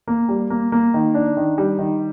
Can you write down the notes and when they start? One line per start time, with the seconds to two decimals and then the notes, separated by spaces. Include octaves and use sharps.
0.07 A#3
0.29 G3
0.50 A#3
0.72 A#3
0.94 D#3
1.14 D4
1.37 D#3
1.58 G3
1.79 D#3